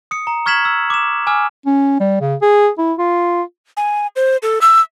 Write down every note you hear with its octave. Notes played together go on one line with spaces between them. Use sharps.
D#6 C#7
A#5
C#6 F6 G#6 B6 E7 F#7
E6
D6 E7
G#5 D6 E6 F6
C#4
G3
C#3
G#4
E4
F4
G#5
C5
A4
E6